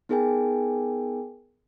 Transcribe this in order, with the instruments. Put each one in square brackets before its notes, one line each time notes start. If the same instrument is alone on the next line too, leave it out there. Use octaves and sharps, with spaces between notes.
[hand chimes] B3 D#4 G#4 A#4 G5 G#5